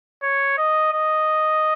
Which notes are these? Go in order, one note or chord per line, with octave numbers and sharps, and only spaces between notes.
C#5
D#5
D#5